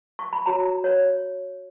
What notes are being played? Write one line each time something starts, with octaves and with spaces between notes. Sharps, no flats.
C#6
B5
F#4 C#5 A#5
C#5